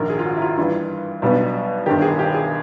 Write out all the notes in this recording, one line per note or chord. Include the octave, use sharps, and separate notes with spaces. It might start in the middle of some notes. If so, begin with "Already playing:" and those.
Already playing: A#1 G#2 D#3 A#4
G#4
F4
F#4
E4
F4
G2 E3 G3 F4
B1 B2 G3 B3 D4
G1 G2 D#3 G4
G#4
G4
G#4